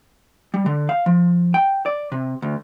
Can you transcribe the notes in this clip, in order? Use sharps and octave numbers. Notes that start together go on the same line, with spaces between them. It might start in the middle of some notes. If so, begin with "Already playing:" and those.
G3
D3
F5
F3
G5
D5
C3
D2